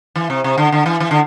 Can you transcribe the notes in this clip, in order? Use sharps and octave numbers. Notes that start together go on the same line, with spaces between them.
E3
C3
C3
D3
D3
E3
E3
D3